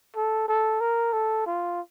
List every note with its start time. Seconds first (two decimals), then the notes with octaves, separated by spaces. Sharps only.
0.16 A4
0.48 A4
0.81 A#4
1.13 A4
1.46 F4